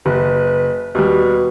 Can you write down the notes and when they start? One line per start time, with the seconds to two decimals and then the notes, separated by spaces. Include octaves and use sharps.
0.06 F#1 B4
0.95 D#2 B2 G3